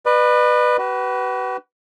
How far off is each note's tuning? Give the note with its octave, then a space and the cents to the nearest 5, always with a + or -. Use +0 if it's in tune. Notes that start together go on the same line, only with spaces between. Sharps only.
B4 +0 D5 +45
F#4 +40 B4 +0